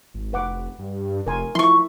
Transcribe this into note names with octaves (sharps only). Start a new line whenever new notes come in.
G#1
F1 B4 F#5 D6
G2
F1 A#4 G#5 C6
F3 E4 C6 C#6